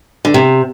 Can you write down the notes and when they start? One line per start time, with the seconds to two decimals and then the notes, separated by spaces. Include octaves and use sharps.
0.25 D3
0.34 C3